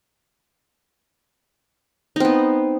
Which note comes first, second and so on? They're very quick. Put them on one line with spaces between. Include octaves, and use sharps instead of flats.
D#4 C4 B3